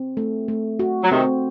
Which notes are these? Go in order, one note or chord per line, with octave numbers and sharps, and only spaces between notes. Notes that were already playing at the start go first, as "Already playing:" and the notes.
Already playing: C4
A3
A3
F#4
F#3
C3 D#3 C4